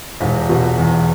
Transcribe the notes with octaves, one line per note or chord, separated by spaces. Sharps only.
E1
B2
E2